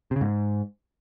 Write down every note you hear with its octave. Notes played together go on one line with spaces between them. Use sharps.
C3
C#3
G#2